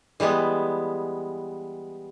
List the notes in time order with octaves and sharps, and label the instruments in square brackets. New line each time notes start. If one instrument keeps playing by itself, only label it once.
[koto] E3 G3 G#3 B3